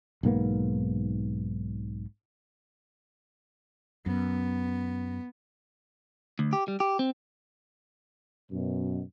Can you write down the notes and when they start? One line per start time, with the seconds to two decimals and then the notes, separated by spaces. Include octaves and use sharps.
0.23 B1 G#2 A#3 B3
4.06 F#2 B3
6.39 D2
6.53 G4
6.68 G3
6.80 G4
6.99 C4
8.51 F#2 B2